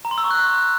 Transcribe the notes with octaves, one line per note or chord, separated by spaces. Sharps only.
A#5
C6
E6
C#6
F#6